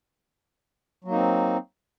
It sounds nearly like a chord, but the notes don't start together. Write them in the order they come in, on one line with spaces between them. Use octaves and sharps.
F#3 A#3 D#4 C4